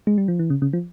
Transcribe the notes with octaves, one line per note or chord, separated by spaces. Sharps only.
G#3
G3
F3
E3
C#3
C#3
F3